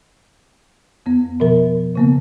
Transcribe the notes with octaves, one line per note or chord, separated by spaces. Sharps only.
F2 B3
B2 F3 A#4
C#3 A#3 B3